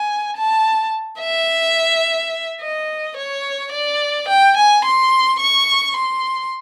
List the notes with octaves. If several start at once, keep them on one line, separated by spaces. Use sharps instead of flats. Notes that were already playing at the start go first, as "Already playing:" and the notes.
Already playing: G#5
A5
E5
D#5
C#5
D5
G5
G#5
C6
C#6
C6